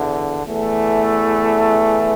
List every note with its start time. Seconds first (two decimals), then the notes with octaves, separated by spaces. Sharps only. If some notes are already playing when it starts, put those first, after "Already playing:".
Already playing: E2 D3
0.45 E2 E3 A3